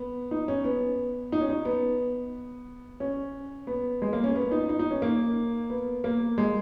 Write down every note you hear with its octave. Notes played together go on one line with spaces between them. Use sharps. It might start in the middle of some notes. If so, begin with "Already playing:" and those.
Already playing: B3
D#4
C#4
B3
D#4
C#4
D#4
B3
C#4
B3
G#3
A#3
C#4
B3
D#4
D#4
D#4
C#4
A#3
B3
A#3
G#3